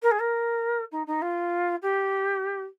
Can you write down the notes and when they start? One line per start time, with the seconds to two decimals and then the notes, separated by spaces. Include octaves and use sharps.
0.03 A#4
0.11 G#4
0.20 A#4
0.92 D#4
1.07 D#4
1.22 F4
1.82 G4